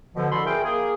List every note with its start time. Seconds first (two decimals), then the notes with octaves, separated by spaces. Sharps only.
0.15 B2 D3 F3
0.31 C2 D3 F#4 A4 B5 C6
0.45 E4 G#4 A#4 G5
0.63 A#3 G#4